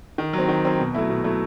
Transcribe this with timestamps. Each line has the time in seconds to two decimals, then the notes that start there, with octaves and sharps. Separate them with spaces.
0.18 D#3
0.33 F#3
0.38 C4
0.48 D#3
0.65 F#3 C4
0.79 B2
0.95 F#3 A3 E4
1.10 B2
1.24 F#3 A3 E4